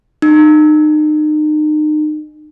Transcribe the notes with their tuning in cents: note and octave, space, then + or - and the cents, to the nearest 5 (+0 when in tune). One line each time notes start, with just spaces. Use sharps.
D#4 -35